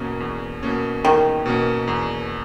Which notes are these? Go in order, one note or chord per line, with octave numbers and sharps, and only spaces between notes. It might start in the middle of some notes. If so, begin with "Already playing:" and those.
Already playing: E2 B2 A#3 C#4
E2
B2 A#3 C#4
E2 D#3
B2 A#3 C#4
E2